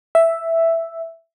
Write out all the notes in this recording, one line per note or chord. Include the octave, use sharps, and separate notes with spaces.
E5